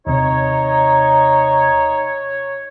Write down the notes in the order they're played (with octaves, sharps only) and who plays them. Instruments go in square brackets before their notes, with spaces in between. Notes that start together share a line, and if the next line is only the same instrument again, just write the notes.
[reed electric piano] D#2 C3 [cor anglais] D#4 [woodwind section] C#5